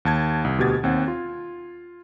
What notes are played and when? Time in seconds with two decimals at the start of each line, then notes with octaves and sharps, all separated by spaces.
0.05 D#2 A5 G#6
0.44 C2
0.58 D2 B2 G4 G#6 A6
0.83 D#2 C4 F#5
1.08 F4